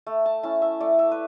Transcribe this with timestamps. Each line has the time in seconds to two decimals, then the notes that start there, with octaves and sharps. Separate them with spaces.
0.07 A3
0.26 A5
0.43 C#4 E4 A5
0.62 E5
0.80 A3 D5
0.99 E5
1.11 B4